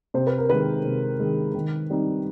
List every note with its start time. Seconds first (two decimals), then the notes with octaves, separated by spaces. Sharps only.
0.14 C3 C5
0.27 B4
0.38 A#4
0.49 D#3 G#3 B4
0.85 C3
1.19 D#3 G#3
1.55 D#3
1.90 G3 C4 D#4